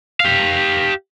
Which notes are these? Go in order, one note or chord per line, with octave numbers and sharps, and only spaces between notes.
G4 F5